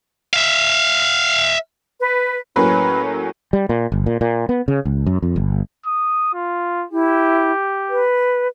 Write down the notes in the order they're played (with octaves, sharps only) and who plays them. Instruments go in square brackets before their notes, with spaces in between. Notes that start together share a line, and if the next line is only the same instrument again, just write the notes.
[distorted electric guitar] E5 F5
[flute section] B4
[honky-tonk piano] A2 F#3 A#3 [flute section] C#4 [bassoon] B4
[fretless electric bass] G3
A#2
G1
A#2
A#2
B3
C#3
C#2
F#2
F2
G1
[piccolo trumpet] D#6
F4
[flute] E4 [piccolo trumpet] G4
[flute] B4